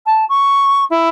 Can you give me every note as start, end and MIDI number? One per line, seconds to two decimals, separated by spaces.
0.06 0.24 81
0.29 0.84 85
0.90 1.09 64